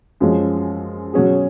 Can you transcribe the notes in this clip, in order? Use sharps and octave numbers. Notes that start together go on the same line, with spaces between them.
F#2 F3 G#3 C#4
B2 F#3 C#4 G#4